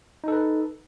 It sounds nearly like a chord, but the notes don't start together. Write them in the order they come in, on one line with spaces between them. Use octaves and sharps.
D#4 A4 B4